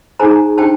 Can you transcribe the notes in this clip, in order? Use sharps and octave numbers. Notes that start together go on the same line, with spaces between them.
D#4 G#4 C5 G#5 A#5
D4 G4 C5 G5 A5